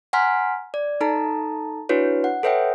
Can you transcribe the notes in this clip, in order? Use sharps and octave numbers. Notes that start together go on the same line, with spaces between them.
F#5 G#5 A#5 C6 F6 B6
D5
D#4 A4 A5 A#5
D4 E4 F#4 B4 C#5
F#5
A4 B4 C#5 E5 F#5 G5